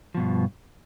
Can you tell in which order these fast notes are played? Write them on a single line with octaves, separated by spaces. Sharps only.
F3 B2 G2